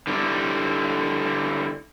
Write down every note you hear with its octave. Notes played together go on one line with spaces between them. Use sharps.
D3 G3 E4